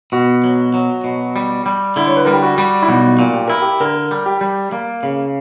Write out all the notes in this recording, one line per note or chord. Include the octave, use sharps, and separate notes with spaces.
B2 F#4
F#3
F#3
B2
G3
G3
D3 E4
C#5
B4
G3 A#4
G4
F#4
G3
E4
B1 F#4
A#2
G4
E4 A#4
G4
D3 A#4
G3
G4
G3
A#3
C#3